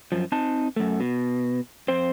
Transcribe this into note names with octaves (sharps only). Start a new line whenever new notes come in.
F#2 F3
C4 D#4 A5
F#2 A3
B2
F2 C4 C5